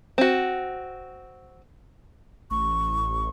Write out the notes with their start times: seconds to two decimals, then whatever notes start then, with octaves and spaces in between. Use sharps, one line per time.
0.18 C4 F#4
2.51 A1 C#6